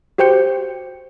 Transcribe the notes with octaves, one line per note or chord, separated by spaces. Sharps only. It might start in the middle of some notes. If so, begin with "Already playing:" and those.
F#4 G4 C5 G5 G6 C#7